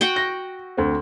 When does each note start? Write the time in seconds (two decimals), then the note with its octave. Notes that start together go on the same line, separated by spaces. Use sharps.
0.01 F#4 F#5 G5
0.16 A#6
0.77 D2 C4